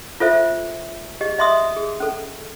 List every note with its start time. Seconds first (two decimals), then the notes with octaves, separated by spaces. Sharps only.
0.20 F4 A4 C5 E5
1.21 G4 G#4 D#5
1.38 D#5 E5 C6 D6 D#6
1.76 G#4
2.00 C#4 A4